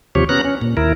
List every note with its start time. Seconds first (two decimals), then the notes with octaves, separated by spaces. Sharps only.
0.15 D#2 C3 F3 G4 C#5
0.29 B3 C#4 A#5 F#6
0.45 C#4
0.62 A#2
0.77 D#2 E4 A#4